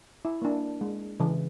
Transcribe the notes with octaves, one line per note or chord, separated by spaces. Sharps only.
E4
A#3 D4
G#3
C#3 E3